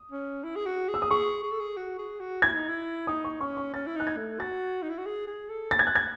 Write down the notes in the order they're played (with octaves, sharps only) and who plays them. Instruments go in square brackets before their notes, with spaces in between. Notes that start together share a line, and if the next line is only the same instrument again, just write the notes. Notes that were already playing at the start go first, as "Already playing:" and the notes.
Already playing: [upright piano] D#6
[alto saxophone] C#4
E4
G#4
F#4
G#4
[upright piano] E6
D#6
[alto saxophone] G#4 [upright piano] C#6
[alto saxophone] G#4
A4
G#4
F#4
G#4
F#4
[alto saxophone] E4 [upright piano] G#6
[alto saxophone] D#4
E4
[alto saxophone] D#4 [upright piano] D#6
[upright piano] C#6
[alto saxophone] C#4 [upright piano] C#6
[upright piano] C#6
[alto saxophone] C#4 [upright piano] A6
[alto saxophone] E4
[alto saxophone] D#4 [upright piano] F#6
[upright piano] G#6
[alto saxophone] A3
[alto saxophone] F#4 [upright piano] A6
[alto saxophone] D#4
E4
F#4
G#4
G#4
A4
[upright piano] A6
G#6
F#6
G#6